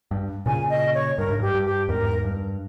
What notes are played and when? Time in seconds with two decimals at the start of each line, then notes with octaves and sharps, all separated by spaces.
0.11 G2
0.46 A#2 C#3 G#5
0.70 D#5
0.94 C#5
1.18 G2 A#4
1.29 G#2
1.40 G2 G4
1.54 G2
1.66 G4
1.88 E2 G#2 A#4
2.24 G2